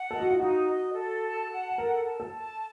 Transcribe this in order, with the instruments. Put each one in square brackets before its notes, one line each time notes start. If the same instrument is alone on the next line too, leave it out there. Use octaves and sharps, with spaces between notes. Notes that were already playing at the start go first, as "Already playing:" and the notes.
Already playing: [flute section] F#5
[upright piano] A4 [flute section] D#5
[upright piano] F#4
F4
[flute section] D#4 [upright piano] F#4
[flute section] D#5
A4
A5
F#5
[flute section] A4 [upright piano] A#4
[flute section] A5
[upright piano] A4
[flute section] A5